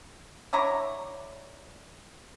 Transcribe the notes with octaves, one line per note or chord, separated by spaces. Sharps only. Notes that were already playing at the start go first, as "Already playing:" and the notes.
D3 E4 C#5 A#5